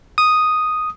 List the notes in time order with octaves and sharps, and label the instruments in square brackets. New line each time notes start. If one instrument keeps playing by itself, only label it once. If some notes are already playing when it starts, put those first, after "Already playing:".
[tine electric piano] D#6